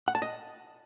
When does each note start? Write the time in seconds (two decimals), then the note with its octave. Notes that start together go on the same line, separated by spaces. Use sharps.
0.08 F#5
0.15 A5
0.22 D#5